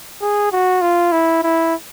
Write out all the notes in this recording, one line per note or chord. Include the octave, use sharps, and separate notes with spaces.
G#4
F#4
F4
E4
E4